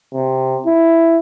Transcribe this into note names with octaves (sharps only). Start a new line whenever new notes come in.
C3
E4